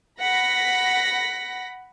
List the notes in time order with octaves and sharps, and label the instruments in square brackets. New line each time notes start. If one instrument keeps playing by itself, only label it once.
[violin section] F#5 B5 A#6 B6